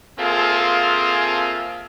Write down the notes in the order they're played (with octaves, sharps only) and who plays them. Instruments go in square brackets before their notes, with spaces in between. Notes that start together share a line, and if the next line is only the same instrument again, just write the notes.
[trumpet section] A#3 C4 F4 G#4 A4 E5